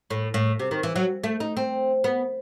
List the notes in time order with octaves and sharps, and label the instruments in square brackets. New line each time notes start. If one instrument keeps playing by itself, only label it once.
[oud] A2
A2
C3
D#3
E3
F#3
A3
D#4
C4
B3